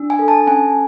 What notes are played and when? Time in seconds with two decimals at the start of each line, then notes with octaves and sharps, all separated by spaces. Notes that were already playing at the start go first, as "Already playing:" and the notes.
Already playing: D4
0.10 G#5
0.19 A4
0.28 A5
0.47 C#4 G#5